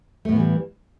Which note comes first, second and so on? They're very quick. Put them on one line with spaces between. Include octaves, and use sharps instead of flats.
A3 A2 B3 E3 G3